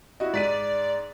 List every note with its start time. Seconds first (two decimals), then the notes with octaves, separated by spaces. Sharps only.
0.20 E4 F#4 D#5
0.34 G#2 D5 B6 D#7